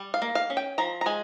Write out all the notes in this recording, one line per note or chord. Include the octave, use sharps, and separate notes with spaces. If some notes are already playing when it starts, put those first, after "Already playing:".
Already playing: G3
F5
A#3
F5
C#4
G5
F3 A#5
A#5
G#3 G#5